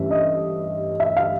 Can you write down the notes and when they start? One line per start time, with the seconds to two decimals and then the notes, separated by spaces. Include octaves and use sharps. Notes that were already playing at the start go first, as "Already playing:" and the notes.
Already playing: G2 E3 A3 C#4 E5
0.11 D#5
1.00 E5
1.17 F5